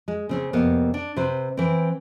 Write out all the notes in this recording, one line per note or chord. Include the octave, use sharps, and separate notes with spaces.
G#3
C#3 C4 C#4
F2 C3 A#3 B3
D4
C3 B4 C5
E3 C4